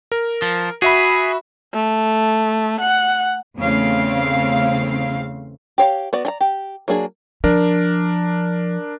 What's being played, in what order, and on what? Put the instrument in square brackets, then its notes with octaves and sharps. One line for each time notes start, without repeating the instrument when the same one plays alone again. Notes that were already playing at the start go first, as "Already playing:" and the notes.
[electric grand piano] A#4
[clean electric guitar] F3
[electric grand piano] F#4 E5 B5 [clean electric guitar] G#4
[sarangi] A3
F#5
[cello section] E2 C#3 A3 C4 F5
[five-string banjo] G4 C#5 F5
B3 F#4 D5
D4 D5 A#5
G4
F#3 A#3 D4 G#4
[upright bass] F3 [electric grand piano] D4 A#4